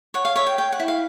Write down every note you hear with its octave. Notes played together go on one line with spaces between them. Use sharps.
C#5 F#5
F5
C#5 E5
G5
C#5 G5
F#5
E4
F5